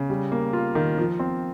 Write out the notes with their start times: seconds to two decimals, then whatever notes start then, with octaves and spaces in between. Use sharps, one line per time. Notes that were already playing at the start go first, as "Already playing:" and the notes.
Already playing: C#3
0.10 G3
0.32 A#3
0.53 F4
0.75 D#3
0.97 F3
1.19 C4